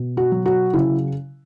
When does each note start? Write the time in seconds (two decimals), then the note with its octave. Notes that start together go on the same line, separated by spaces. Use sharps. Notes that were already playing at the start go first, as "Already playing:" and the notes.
Already playing: B2
0.17 F#4
0.32 F#3
0.46 F#4
0.73 C#3 E4